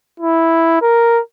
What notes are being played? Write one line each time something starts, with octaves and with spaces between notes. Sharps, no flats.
E4
A#4